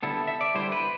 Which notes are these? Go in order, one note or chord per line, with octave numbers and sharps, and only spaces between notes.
D3 G3 B3 E4 A4
E5
D5
D3 G3 B3 E4 C5
B4